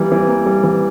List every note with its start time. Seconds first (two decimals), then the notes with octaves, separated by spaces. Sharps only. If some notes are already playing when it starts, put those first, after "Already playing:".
Already playing: E3 G3 A#3
0.12 E3
0.28 A#3
0.46 G3
0.63 E3